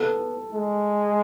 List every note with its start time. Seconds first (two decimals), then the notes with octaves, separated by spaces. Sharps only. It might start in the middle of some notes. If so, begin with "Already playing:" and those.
Already playing: B3 A4
0.54 G#3